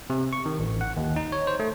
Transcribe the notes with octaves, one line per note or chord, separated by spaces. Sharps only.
C3
C#6
D#3
A1
F#5
D#2
D#4
C#5
C5
A3